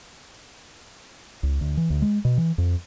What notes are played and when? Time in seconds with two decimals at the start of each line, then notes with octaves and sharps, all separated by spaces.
1.43 C#2
1.61 D2
1.77 E3
1.90 D2
2.02 G#3
2.25 B2
2.38 E3
2.58 F2